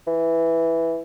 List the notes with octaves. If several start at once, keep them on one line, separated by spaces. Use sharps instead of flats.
E3